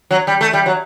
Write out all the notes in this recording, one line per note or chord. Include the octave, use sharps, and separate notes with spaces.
F#3
G3
A3
G3
F#3